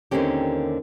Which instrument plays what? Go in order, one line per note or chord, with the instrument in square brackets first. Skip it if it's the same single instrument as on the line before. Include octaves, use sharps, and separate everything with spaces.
[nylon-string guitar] D#2 D3 A#3 C4 C#4 G4